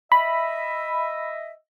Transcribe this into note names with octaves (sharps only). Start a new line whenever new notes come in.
D#5 E5 B5